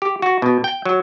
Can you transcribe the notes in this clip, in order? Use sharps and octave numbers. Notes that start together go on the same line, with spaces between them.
G4
F#4
B2
G5
F#3